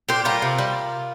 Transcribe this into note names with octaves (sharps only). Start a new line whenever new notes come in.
A#2 G4 C5
G3 F4 A#4
C3
G3